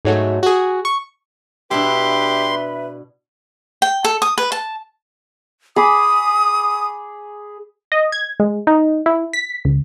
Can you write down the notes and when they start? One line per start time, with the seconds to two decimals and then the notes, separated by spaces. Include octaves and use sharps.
0.05 G#2 F#3 A3
0.43 F#4 G#4
0.85 C#6
1.71 B2 D4 E4 G4 B4 E5 B5 C6
3.82 G5
4.04 A4
4.22 D#6
4.38 B4
4.52 A5
5.76 G#4 B5 D6 D#6
7.92 D#5
8.12 G#6
8.40 G#3
8.67 D#4
9.06 E4
9.33 B6
9.65 C#2